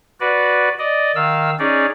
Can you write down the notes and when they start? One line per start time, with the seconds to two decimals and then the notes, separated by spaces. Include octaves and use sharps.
0.20 F#4 B4 D5
0.79 D5 D#5
1.15 D#3 F5 E6
1.59 C#4 D#4 G#4 D5